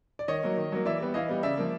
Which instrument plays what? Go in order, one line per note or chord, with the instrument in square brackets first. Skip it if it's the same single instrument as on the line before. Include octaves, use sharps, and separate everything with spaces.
[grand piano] D5
D#3 C#5 D#5
F#3 A#3
D#3
F#3 A#3
E3 D5 E5
G3 B3
E3 D#5 F5
G3 B3
C#3 D5 E5
F3 A#3